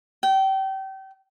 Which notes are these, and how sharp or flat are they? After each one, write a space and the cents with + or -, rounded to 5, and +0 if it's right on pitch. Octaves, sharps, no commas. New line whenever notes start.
G5 -30